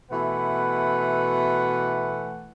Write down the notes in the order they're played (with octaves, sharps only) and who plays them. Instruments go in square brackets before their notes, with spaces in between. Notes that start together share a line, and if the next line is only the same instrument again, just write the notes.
[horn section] B2 E3 A3 B4 F#5